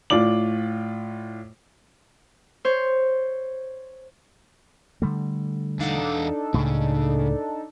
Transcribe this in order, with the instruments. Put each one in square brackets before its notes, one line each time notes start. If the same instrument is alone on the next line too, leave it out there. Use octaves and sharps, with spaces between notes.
[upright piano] A2 F4 D5 D6 F#7
[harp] C5 C#5
[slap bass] D3 G3 A3
[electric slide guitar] E2 F5 F#5 [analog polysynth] D4 D#4 A4
[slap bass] C#2 A2 [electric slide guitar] C#3